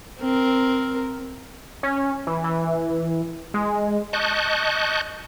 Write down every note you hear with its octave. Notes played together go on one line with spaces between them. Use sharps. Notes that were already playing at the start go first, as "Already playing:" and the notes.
C4 A#4
C#4
E3
E3
G#3
D#5 A5 C#6 F#6 G6